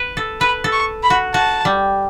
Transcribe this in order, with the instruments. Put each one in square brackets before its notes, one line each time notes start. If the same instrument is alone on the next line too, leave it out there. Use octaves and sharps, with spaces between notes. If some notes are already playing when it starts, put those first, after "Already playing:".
Already playing: [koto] B4
A4
[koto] B4 [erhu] B5
[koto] A4
[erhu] C#6
B5
[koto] F#4
[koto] F#4 [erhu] A5
[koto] G3